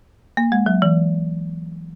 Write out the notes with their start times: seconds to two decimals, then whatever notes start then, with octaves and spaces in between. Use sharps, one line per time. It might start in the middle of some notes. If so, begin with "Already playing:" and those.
0.37 A#3
0.52 G#3
0.66 F#3
0.82 E3